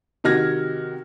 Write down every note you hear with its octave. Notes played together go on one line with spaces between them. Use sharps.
C3 D#3 F#4 F6 G#6 A#6